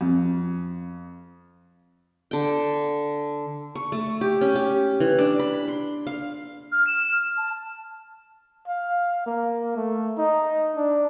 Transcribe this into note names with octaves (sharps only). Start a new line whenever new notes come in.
F2
D3 G5
C#6
A3
G4
C#4
G4
E3
D4
B5
C6
F5
F6
E7
F6
A5
F5
A#3
A3
D#4
D4